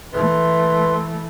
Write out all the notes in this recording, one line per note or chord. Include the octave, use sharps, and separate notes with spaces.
E3 A3 B4 E5 C6